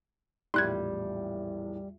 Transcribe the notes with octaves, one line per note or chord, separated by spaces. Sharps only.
A#1 E2 A2 G3 C6 F#6 G#6